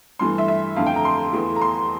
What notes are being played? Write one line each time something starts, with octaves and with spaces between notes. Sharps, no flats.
G2 E3 A3 C6
E5
E5
F2 D3 A3 F5
G5
A#5
C6
E2 E3 A3
A#5
C6